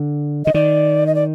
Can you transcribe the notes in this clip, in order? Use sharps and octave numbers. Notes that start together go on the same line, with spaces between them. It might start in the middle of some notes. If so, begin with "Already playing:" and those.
Already playing: D3
D3 D#5
D#3 D5
D#5
D5